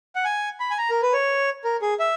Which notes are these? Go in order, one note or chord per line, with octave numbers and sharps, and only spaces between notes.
F#5
G#5
B5
G#5
A#5
A#4
B4
C#5
A#4
G#4
E5